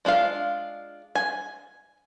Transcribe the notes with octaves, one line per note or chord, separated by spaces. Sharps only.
G#3 D4 F4 F5
G#5